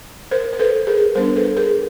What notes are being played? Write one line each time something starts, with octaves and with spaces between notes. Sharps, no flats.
A#4 C5
C5
A4 B4
G#4 A#4
G3 B3 D4 A#4 C5
A4 B4
G#4 A#4